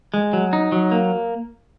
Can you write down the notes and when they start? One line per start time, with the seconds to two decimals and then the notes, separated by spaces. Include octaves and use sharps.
0.14 G#3
0.33 F#3
0.53 D#4
0.72 F#3
0.92 A#3